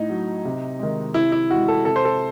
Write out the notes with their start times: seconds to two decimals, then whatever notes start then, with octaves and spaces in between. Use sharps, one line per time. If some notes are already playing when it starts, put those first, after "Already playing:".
Already playing: A2 D#4
0.09 F#3
0.45 C3
0.79 D#3 G#3
1.14 C3 E4
1.32 E4
1.50 E3 G#3 F#4
1.68 A4
1.85 C3 A4
1.96 C5
2.05 A4